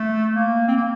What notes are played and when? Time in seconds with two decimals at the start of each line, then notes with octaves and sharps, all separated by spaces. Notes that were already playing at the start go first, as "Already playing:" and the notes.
Already playing: A3
0.35 A#3
0.68 C4
0.78 A#3